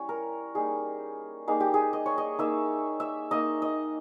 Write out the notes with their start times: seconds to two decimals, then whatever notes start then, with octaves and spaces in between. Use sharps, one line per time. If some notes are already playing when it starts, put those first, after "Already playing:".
Already playing: G3 C#4 E4 C#5
0.09 A#4
0.55 G3 A#3 D#4 G#4
1.47 G3 A#3 D#4 G#4
1.60 G4
1.74 G#4
1.93 D#5
2.06 C#5
2.18 D#5
2.39 A#3 D#4 E5
3.00 E5
3.31 A#3 D#4 D#5
3.62 D#5